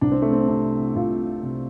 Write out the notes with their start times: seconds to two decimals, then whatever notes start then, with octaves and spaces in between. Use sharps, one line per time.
0.01 C2 D4
0.12 C4
0.22 A3
0.33 C4
0.48 C3 D4
0.96 C2 F4
1.43 C3